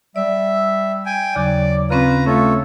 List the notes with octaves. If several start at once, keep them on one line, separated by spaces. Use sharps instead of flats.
G3 D5 E5
G5 G#5
D#2 C#3 F#3 D5
C#3 C4 C#4 F4 B4 A#5
A3 C#4 F4 A4 C#5